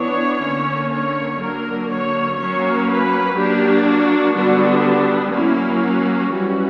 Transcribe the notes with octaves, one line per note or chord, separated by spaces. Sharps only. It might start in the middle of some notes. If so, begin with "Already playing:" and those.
Already playing: E3 B3 D4 C#5
D3 A#3 C#4
C#5
D3 F#3 A#3 A#4
C#5
F#3 A#3 C#4 C#5
B4
F#3 A#3 D4 G4
F#4
D3 G3 B3 D4 F#4
F#3 A#3 C#4 E4
F#4
E3 G3 C#4 F#4